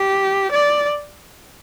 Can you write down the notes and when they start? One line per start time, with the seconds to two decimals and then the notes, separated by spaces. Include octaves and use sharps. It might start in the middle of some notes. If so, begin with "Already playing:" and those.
Already playing: G4
0.51 D5